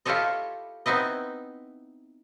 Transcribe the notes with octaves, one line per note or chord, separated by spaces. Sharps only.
E4 F4 G4 A4 C#5 D#5
B3 C4 D#4 E4 D#5